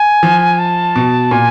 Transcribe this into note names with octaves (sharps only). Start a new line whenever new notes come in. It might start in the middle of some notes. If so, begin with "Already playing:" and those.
Already playing: G#5
F3
A5
B2
A#2 G#5